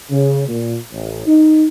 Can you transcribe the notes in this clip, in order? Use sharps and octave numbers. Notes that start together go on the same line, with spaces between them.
C#3
A#2
A1
D#4